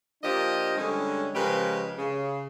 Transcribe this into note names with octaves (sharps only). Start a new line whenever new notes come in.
F3 A#3 D4 G4 D#5
D3 G3 G#3 C#4
C#3 F3 G#3 G4 A#4 B4
C#3